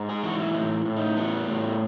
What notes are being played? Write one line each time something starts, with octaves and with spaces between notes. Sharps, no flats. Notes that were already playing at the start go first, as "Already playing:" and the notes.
Already playing: G#2
G#4
E3 F#4
E4
A2 D#4
A2
D#4
E3 B3
A2